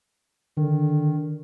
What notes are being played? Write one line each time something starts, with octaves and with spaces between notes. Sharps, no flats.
D3 D#3